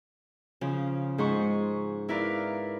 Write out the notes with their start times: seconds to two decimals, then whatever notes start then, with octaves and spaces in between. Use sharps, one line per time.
0.61 C#3 F3
1.18 G#2 G#4 C5 C#6
2.09 E4 A#4 B4 D5 F5